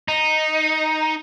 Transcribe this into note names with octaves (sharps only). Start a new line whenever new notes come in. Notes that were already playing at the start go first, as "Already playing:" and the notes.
D#4